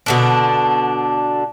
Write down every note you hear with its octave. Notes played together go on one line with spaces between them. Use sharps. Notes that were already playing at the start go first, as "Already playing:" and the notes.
B2 D3 D4